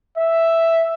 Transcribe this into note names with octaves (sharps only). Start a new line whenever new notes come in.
E5